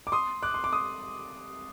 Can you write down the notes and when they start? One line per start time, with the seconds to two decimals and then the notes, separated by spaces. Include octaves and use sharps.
0.07 D6
0.12 C6 D#6
0.42 D6 F#6
0.54 C6
0.64 D6
0.73 C6 D#6